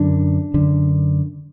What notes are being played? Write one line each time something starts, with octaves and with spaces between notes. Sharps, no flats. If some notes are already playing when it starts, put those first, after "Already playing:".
Already playing: F#2 D3 D4
F#2 D3